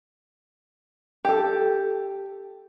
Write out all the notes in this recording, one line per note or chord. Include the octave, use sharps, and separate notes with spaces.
G4 A4